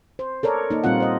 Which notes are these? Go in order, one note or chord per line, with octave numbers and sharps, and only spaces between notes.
C5
A4 A#4 C#5 D5
A#3 D#4
A#2 G3 C4 F4 F#5
C5 D#5